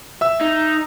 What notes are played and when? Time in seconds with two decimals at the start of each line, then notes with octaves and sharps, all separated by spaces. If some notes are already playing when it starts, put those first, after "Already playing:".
0.21 E5 E6
0.41 D#4